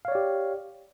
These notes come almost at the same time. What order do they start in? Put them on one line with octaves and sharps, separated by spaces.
F5 C#5 D5 G4